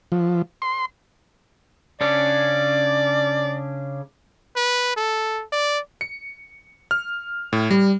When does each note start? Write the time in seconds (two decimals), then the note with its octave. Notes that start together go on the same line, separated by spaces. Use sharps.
0.12 F3
0.62 C6
2.01 C#3 C#4 D4 D5
4.56 B4
4.96 A4
5.52 D5
6.01 C#7
6.91 F6
7.53 A2
7.71 G3